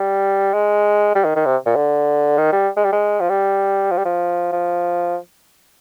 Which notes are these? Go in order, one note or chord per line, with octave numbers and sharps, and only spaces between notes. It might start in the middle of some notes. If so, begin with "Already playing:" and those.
Already playing: G3
G#3
G3
D#3
D#3
C3
A#2
D3
D#3
G3
G#3
G3
G#3
F3
G3
F3
G3
F3
F3